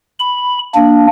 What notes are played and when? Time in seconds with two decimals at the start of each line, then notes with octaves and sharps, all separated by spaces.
0.19 B5
0.75 A#3 D4